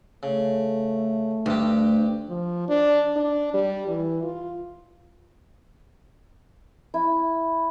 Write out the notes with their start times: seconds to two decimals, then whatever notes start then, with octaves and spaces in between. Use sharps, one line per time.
0.23 C#3 A3
1.46 D2 G2 G4
2.29 F3
2.68 D4
3.16 D4
3.54 G3
3.88 E3
4.23 F4
6.94 E4